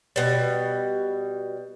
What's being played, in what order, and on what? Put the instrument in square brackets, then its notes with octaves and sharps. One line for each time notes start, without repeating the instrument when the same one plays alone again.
[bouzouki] B2 G3